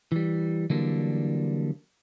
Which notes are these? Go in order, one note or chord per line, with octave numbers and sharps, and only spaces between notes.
E3 G3
D3 E3 F#3 G3 A#3 D4